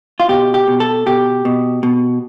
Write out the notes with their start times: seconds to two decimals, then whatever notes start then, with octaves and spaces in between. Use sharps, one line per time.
0.20 F4
0.29 B2 G4
0.54 G4
0.68 B2
0.80 A4
1.06 B2 G4
1.45 B2
1.83 B2